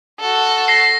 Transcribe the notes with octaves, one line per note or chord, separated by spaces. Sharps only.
F#4 A4
A#6 C7